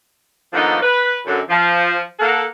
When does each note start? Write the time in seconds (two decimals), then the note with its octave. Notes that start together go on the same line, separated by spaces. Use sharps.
0.53 D3 D#3 F3 A#3 B3 D#4
0.83 B4
1.26 F#2 D3
1.49 F3
2.20 A#3 A4 F#5